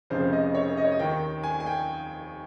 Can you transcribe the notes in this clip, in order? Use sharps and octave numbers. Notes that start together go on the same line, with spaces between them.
F1 F2 C#3 C5
D#5
C#5
D#5
C#5
D#5
D#2 D#3 G5
G#5
G#5
G5